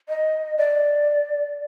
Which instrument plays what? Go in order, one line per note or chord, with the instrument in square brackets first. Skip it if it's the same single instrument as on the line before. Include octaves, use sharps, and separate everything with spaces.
[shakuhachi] D#5
D5